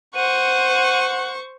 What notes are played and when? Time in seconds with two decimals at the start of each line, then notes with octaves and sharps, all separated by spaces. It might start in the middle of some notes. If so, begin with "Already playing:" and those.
0.15 C5 F#5 C#6 D#7